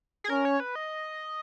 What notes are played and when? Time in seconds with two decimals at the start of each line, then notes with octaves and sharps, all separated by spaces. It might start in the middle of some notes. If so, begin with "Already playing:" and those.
0.24 G#4
0.30 C#4 A#4
0.45 C#5
0.60 B4
0.75 D#5